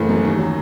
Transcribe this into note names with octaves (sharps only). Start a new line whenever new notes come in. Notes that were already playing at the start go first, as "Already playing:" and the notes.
Already playing: F#1 A2 E3 A3
F#2
D#2
F#3